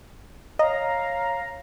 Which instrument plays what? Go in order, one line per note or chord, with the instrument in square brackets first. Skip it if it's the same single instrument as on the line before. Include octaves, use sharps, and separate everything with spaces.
[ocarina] C#5 [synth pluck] D#5 [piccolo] F5 [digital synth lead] A#5